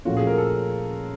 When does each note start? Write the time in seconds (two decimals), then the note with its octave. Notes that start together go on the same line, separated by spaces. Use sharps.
0.05 A#2 F3 A3 C#4 F4 F#4
0.17 G#4
0.27 A#4
0.38 A4